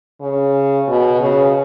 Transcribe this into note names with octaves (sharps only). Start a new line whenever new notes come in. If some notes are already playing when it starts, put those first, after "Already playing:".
C#3
B2
C#3